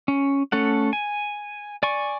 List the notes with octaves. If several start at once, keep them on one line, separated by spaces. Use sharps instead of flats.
C#4
A3 C#4 A4 F#5
G#5
D5 G#5 C#6